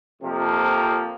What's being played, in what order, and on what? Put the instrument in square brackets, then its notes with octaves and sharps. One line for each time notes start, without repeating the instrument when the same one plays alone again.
[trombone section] F2 C3 F3 A#3